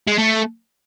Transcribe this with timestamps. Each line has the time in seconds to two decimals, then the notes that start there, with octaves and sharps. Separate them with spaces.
0.07 G#3
0.18 A3